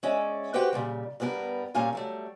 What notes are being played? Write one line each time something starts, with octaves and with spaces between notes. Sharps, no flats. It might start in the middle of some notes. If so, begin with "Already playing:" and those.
G#3 C#4 D5 E5
F#4 G4 B4 C5 F#5 G5
A#2 C#3 G3
G2 G3 B3 G4 A#4
A#2 G3 A#3 C#4 F5 G#5
F#3 G3 A3